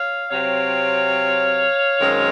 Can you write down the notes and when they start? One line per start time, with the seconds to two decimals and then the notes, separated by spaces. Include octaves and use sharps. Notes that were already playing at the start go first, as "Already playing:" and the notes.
Already playing: C#5 F5
0.30 C3 F#3 C4 C#5 F5
2.00 F#2 D#3 G#3 C4